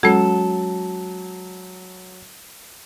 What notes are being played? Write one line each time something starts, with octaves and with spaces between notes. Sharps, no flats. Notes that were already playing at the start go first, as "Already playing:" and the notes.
F#3 G#3 C#4 A4